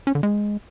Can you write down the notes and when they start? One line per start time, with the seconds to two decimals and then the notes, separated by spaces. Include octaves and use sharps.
0.07 C#4
0.15 D3
0.23 G#3